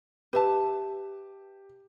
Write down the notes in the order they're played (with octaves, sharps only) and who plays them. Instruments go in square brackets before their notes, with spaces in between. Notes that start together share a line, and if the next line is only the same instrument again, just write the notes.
[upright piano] G4 [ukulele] B4 E5 A5